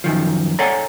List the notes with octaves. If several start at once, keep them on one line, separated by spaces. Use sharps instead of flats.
F#2 D#3 F3
A4 C#5 D5 F#5 G#5 A#5